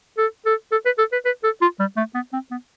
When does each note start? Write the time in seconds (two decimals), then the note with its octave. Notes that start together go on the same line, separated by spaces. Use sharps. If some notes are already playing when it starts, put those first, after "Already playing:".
0.18 A4
0.46 A4
0.72 A4
0.85 B4
0.98 A4
1.12 B4
1.25 B4
1.44 A4
1.61 F4
1.79 G3
1.97 A3
2.15 B3
2.33 C4
2.51 B3